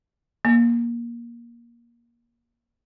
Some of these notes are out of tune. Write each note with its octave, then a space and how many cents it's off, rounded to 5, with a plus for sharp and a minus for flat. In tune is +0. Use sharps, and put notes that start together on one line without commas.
A#3 +15